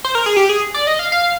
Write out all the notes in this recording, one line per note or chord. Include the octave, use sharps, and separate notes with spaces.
C5
A#4
G#4
G4
G#4
D5
D#5
F5
F5